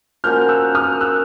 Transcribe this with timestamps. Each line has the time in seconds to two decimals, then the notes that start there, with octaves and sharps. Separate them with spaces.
0.24 F3 A#3 C#4 F#4 F6 G6
0.49 E6 F#6
0.75 D#6 F6
1.01 E6 F#6